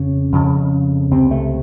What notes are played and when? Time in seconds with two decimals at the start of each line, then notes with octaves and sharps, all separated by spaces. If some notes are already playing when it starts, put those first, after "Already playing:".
Already playing: F2 C#3 C#4
0.32 F2 C#3
1.11 C#2 C3 C4
1.31 A3